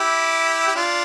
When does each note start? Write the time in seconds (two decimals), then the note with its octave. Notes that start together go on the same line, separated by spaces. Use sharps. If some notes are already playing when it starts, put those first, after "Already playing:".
Already playing: E4 G4
0.67 G4
0.75 D4 F4